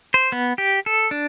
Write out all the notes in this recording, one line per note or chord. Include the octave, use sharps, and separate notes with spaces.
C5
B3
G4
A4
D4